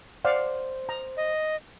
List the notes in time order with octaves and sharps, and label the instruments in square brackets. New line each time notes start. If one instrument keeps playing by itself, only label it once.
[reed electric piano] C5 [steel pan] D5 F5 F#5
[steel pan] A#5
[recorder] D#5